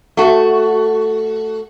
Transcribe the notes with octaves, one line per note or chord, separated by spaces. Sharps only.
A3 F#4